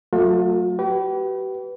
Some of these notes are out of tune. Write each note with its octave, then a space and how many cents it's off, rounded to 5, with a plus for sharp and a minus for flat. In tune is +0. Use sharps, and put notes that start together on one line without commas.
F#3 +0 A3 +20 F4 +45
G4 -40 B4 +0